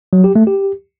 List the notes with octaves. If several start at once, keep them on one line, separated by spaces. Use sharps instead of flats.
F#3
G4
A3
G4